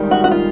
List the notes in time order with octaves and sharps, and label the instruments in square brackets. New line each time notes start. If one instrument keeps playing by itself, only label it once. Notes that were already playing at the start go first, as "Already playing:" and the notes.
Already playing: [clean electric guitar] G#2 D#3 G3
[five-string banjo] F#4
F#4
F4